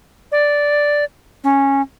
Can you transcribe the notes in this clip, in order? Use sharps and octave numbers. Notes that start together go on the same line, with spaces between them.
D5
C#4